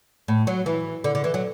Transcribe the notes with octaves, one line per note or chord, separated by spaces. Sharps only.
A2
F#3
E3
D3
D3
E3
F#3